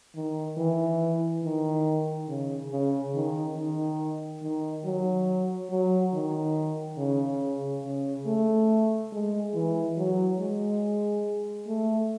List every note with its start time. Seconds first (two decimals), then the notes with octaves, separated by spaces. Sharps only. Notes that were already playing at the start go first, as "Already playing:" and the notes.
0.15 D#3
0.57 E3
1.44 D#3
2.28 C#3
2.71 C#3
3.14 D#3
3.57 D#3
4.42 D#3
4.85 F#3
5.70 F#3
6.13 D#3
6.98 C#3
7.84 C#3
8.26 A3
9.12 G#3
9.54 E3
9.98 F#3
10.40 G#3
11.67 A3